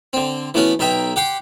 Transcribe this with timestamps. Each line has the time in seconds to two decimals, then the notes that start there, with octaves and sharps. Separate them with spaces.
0.13 D3 C4
0.54 E3 A3 B3 C#4 F#4
0.79 B1 D#4 E5 G5
1.16 G4 F#5 G5 C6